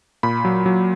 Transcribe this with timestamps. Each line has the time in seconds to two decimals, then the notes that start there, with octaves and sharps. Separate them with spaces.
0.23 A#2 B5
0.45 F#3
0.66 F#3